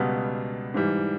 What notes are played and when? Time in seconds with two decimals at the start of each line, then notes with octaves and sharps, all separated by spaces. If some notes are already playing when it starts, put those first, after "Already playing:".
Already playing: C#2 B2 G3 B3
0.74 G#2 E3 G3